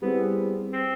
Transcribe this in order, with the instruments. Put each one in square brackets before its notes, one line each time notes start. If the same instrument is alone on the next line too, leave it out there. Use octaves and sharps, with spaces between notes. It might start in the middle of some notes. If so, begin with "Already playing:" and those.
[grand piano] G3 C4 E4 G#4 [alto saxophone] B3
[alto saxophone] C4